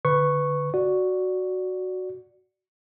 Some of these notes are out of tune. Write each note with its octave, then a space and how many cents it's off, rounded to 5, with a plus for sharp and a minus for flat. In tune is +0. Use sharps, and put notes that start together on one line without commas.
D3 +0 B4 +10 C#6 -5
F#4 +0 D5 +0